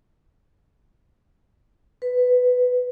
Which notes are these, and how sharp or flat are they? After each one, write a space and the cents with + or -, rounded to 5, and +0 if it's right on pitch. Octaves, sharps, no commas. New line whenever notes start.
B4 +10